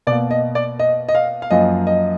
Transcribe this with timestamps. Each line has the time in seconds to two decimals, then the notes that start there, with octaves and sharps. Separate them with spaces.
0.07 B2 D5
0.11 A#3
0.31 D#5
0.55 D5
0.79 D#5
1.09 D#5
1.15 F5
1.42 F5
1.51 F#2 F3 A#3 D#5
1.87 D#5